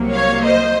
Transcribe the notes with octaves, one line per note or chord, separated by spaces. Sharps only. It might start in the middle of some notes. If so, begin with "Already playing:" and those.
Already playing: C2 C3 F#3 A#3
C#5 F5
C5 D#5